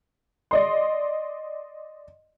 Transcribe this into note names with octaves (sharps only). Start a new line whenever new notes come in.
D5 D#5 C6